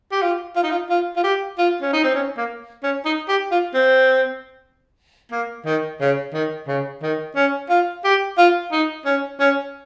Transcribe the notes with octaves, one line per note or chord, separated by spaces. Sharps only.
G4
F4
F4
D#4
F4
F4
F4
G4
F4
C#4
D#4
C4
C#4
A#3
C#4
D#4
G4
F4
C4
A#3
D#3
C#3
D#3
C#3
D#3
C#4
F4
G4
F4
D#4
C#4
C#4